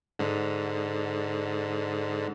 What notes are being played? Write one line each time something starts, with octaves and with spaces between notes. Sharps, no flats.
G#2 D3